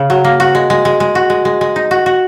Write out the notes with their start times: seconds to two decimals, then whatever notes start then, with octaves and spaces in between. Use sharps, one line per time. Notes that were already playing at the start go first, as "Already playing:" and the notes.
Already playing: C#3
0.10 F#3
0.25 A#3
0.40 F#4
0.55 G#3
0.70 G#3
0.85 G#3
1.00 G#3
1.15 F#4
1.30 G#3
1.45 G#3
1.61 G#3
1.76 D#4
1.91 F#4
2.06 F#4